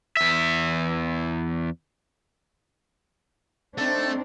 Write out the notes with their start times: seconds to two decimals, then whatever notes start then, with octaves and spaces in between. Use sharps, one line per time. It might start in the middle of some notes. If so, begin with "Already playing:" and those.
0.17 E2 E5
3.78 A3 C4 D4 D#4